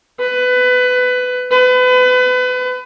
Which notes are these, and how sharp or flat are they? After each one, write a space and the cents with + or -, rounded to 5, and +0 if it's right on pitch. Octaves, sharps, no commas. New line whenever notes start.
B4 +20
B4 +30